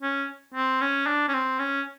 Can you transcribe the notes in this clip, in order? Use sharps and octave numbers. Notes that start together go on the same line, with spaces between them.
C#4
C4
C#4
D4
C#4
C4
C#4